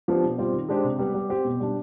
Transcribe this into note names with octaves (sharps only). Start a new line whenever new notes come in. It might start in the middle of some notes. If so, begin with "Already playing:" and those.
F3 B3 D4 G4
B2
G3 C4 F4 C5
D#3
G#3 D4 G4 C5
C3
G3 B3
G3
C4 G4 C5
B2
G3 D4